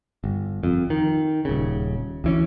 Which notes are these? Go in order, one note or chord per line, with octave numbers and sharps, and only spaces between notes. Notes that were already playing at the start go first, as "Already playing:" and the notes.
G1
F2
D#3
D#1 C#3
D2 E3 C#4